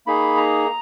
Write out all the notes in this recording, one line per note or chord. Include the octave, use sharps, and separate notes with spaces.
A#3 D#4 G#4 B5
A#5